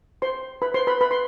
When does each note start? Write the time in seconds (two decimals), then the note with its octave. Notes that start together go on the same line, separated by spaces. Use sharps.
0.22 C5 C6
0.62 B4 B5
0.74 C5 C6
0.87 B4 B5
1.01 B4 B5
1.11 C6